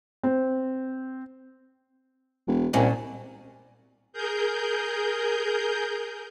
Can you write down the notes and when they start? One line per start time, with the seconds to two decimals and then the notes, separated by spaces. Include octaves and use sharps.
0.23 C4
2.47 E1
2.73 C2 A#2 C#4 D4
4.13 G#4 A#4 G6